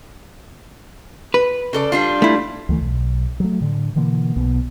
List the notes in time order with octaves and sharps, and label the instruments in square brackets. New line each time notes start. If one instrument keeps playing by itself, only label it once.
[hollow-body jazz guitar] B4
[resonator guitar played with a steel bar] C#3 A4 D5
G3 D4 F4
[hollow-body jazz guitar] A3 E4
[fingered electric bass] D2 E3 A3
B1
F#3 A3
A2 D3
B2 D3 E3 A#3
B1 B2